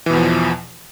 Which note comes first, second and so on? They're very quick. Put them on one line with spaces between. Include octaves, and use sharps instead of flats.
E3 B2 E2 F3